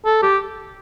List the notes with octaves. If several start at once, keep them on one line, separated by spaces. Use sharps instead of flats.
A4
G4